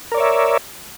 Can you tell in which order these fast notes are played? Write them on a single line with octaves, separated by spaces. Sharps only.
A#4 D5 C#5 E5